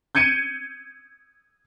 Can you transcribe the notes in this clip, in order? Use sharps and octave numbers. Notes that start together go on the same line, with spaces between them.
G6 G#6 C#7 D#7